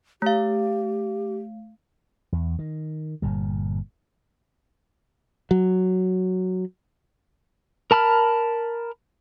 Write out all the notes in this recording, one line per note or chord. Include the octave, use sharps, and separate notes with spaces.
A3 G4 F5
E2
D#3
G1 A#2 G3
F#3
A#4 A5 B5 F6